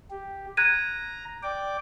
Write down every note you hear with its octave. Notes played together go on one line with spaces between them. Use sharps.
G4
A#5 F#6 G#6 D#7
D5 G5 D6